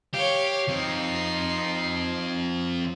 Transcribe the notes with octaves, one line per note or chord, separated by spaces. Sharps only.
G4 C#5 F5
F3 C4 D#4 C7